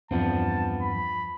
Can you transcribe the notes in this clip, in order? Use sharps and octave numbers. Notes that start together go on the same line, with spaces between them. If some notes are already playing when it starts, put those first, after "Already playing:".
E2 G2 F3 B3 C4 A5
B5